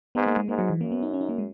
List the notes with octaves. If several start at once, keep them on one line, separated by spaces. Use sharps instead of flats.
G#2 B3
A#3
G#3
G#2 A#3
F#3
E3
F#2 A#3
B3
D#4
C#4
D#4
A#3
G#3